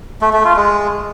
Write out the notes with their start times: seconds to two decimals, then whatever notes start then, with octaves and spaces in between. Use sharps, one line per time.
0.22 A3
0.33 A3
0.45 F4
0.56 G#3